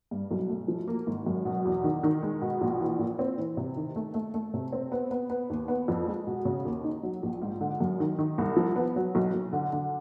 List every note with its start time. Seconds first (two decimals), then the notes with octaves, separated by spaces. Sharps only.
0.11 G2
0.31 B1
0.49 A3
0.68 F3
0.88 A#3
1.07 G#1
1.26 F#2
1.45 B2
1.65 E2
1.84 D#3
2.03 D#3
2.22 G#3
2.41 B2
2.61 A#1
2.80 E3
2.99 A#2
3.19 C4
3.38 E3
3.57 C3
3.77 D#3
3.96 A3
4.14 A3
4.34 A3
4.54 C3
4.72 C4
4.92 B3
5.11 B3
5.30 B3
5.50 D#2
5.68 B3
5.88 F2
6.07 G#3
6.27 B2
6.45 C#3
6.65 D#2
6.84 D#4
7.03 F#3
7.23 A#1
7.42 G#2
7.61 D3
7.80 F#2
8.00 D#3
8.19 D#3
8.38 C2
8.57 F3
8.76 B3
8.96 F#3
9.15 B1
9.34 B1
9.53 D3
9.73 D3